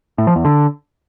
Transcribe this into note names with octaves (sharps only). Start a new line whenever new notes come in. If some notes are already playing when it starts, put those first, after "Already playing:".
A2
F3
E2
D3